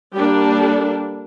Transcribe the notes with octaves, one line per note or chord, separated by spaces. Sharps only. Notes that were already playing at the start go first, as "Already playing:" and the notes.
G3 A#3 D4 G4
A4